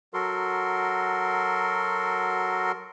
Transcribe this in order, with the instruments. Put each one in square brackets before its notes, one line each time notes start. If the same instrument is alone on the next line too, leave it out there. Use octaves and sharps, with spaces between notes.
[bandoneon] F#3 F#4 A4 A#4 C6